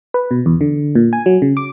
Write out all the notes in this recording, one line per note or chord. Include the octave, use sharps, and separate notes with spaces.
B4
B2
E2
D3
A#2
G#5
F#3
C#3
D6